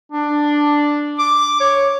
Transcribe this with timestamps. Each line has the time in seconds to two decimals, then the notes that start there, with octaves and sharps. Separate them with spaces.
0.12 D4
1.19 D6
1.60 C#5